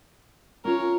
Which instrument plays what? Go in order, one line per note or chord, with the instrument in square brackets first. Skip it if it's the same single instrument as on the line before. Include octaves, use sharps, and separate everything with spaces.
[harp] C#4 F4 [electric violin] A#4 C#5